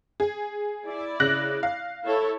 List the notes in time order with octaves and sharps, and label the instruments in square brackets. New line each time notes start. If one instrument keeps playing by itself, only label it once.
[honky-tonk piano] G#4
[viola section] E4 D5
[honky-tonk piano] C#3 F#6 A#6
F5
[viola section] E4 A4 C#5